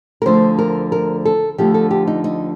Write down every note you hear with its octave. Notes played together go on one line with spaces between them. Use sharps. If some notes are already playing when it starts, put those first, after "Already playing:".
A#4
D2 D3 F3 C5
A#4
A#4
A4
D2 D3 F3 G4
A4
G4
D#4
D#4